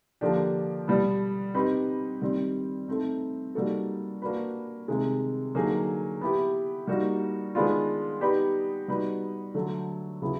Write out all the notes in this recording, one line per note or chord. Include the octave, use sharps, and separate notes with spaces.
D3 F3 A#3 D4 G4
B2 G3 B3
C4 D#4 G4 B4 D#5
D#3 G3 C4
A3 C4 D#4
G3 A#3 D#4 F#4 A4
A#3 D4 F#4 B4
C3 D#3 G#3
D3 F#3 A#3 D#4 G#4
B3 E4 G4
G3 A#3 D#4 F#4
D#3 G#3 B3 D4 F4
B3 D#4 G4 B4 D5
G3 B3 D#4 F#4 B4
D3 F#3 A3
C#3 F#3 B3 E4